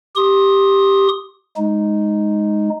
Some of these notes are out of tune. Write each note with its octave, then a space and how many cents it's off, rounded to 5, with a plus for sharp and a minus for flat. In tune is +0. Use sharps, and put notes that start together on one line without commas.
G4 +0 C6 +25 D#6 +0
G#3 +0 D#4 +0